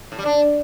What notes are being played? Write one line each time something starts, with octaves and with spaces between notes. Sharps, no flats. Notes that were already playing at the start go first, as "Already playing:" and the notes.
A2
G3
D4